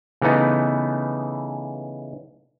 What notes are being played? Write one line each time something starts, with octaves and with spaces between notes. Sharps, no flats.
C#3 E3 A3 B3 D#4